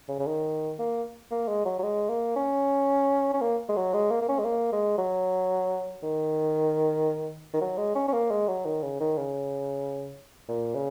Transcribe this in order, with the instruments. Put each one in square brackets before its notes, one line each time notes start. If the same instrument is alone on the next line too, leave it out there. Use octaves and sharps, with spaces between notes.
[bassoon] C#3
C#3
D#3
A#3
A#3
G#3
F#3
F#3
G#3
A#3
C#4
C#4
A#3
G#3
F#3
G#3
A#3
A#3
C#4
G#3
A#3
G#3
F#3
D#3
D#3
F#3
G#3
C#4
C#4
A#3
G#3
F#3
D#3
C#3
D#3
C#3
A#2
C#3